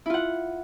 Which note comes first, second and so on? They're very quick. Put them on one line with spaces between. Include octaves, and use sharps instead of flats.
E4 F4 F#5